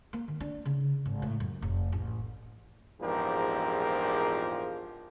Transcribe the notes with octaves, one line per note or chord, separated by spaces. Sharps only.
A#3
D#3
D4
C#3
G#1
A2
F#2
F1
A1
A#1 E2 G#2 F3 G4 A#4